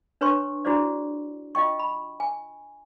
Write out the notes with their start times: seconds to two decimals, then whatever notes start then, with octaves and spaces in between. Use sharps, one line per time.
0.21 D4 B4 C#5 G#5 C6 C#6
0.65 D4 E4 F#4 G#4 C5 D5
1.55 F4 D#5 G5 C#6
1.79 B5
2.20 G#5